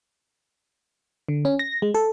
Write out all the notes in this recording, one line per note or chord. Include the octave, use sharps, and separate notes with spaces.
D3
C#4
A#6
G#3
A4